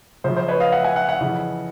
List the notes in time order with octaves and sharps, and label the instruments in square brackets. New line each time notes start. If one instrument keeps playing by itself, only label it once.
[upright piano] F#2 C#3 F3 C5
C5
B4 C#5
D#5 F5
E5 F#5
F#5 G#5
E5 F#5
E5 F#5
F2 C#3 E3